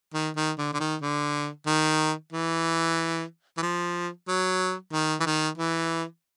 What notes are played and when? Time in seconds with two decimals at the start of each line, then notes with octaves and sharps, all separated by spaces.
0.14 D#3
0.36 D#3
0.58 D3
0.73 D3
0.80 D#3
1.02 D3
1.66 D#3
2.32 E3
3.57 E3
3.62 F3
4.28 F#3
4.92 D#3
5.20 E3
5.26 D#3
5.57 E3